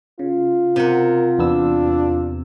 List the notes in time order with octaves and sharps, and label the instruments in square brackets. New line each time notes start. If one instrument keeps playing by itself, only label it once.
[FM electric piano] C#3 [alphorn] F4
[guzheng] C3 F#5 [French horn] A#4
[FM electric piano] E2 B3 E6 [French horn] D4